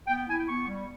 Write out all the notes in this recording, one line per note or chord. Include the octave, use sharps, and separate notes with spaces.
B3 G5
G5
E4 G#5
G5
B3 C#6
G3